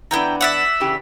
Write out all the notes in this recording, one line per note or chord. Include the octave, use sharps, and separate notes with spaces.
E3 B3 D4 E4 G5 A#5
D5 E5 F#5
C#3 E3 G4